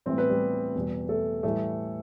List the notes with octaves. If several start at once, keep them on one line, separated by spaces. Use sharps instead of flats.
A2 E3 G3 C4 C5
B3 B4
G3 G4
E2 B2 G3
A3 A4
A2 E3 G3 A3 A4